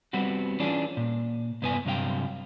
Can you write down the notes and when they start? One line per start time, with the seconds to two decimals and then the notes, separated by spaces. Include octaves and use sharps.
0.13 G3 B3 C4 F#4
0.60 E3 C#4 D4 F4 G#4
0.97 A#2
1.62 C2 G2 B3 E4 G#5
1.86 G2 C3 F#3 F5 G5